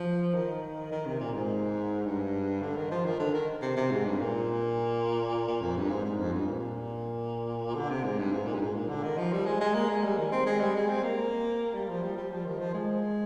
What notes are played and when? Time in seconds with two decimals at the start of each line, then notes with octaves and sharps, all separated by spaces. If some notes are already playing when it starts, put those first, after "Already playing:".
Already playing: F3
0.35 D#3
0.92 D#3
1.06 C3
1.20 A#2
1.34 G#2
2.06 G2
2.63 D3
2.77 D#3
2.91 F3
3.05 D#3
3.20 D3
3.34 D#3
3.62 C3
3.77 C3
3.91 G#2
4.05 G2
4.19 A#2
5.48 A#2
5.62 F2
5.76 G2
5.90 G#2
6.05 G#2
6.19 F2
6.33 G2
6.48 A#2
7.75 D3
7.90 C3
8.04 G#2
8.19 G2
8.32 G#2
8.47 A#2
8.55 G2
8.61 G#2
8.75 A#2
8.89 D3
9.03 D#3
9.18 F3
9.33 G3
9.46 G#3
9.61 G#3
9.75 A#3
9.89 G#3
10.04 G3
10.18 D#3
10.32 C4
10.46 G#3
10.60 G3
10.75 G#3
10.89 C4
11.03 A#3
11.74 G3
11.89 F3
12.03 G3
12.17 G3
12.31 F3
12.46 D#3
12.60 F3
12.74 G#3